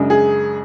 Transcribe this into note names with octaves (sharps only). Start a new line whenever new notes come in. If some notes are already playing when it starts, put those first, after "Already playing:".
Already playing: F#2 C#3 G#3 D4
G#4